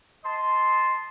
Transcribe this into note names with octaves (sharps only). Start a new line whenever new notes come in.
D#5 A5 C6